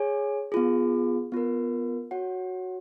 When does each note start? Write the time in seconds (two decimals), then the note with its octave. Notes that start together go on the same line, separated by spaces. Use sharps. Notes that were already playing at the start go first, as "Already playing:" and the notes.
Already playing: G#4 C#5 G#5
0.52 B3 F4 G#4
1.32 B3 F4 A#4
2.11 F#4 C#5 F#5